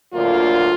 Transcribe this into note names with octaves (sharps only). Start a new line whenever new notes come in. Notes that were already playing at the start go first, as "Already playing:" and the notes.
D2 D3 F#3 A#3 F4